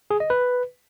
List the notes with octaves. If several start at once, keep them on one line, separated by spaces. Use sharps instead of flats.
G#4
D#5
B4